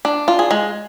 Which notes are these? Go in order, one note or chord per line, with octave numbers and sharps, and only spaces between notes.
D4
F4
G#4
G#3